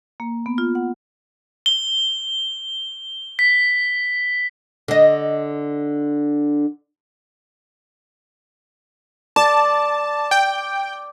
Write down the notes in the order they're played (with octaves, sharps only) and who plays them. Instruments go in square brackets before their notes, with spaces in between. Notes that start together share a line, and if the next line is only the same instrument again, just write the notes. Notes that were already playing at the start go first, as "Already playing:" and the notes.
[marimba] A#3
B3
F4
F#5
[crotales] G7
B6
[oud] D3 D#5
[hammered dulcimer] D5 [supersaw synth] A5
[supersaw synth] G5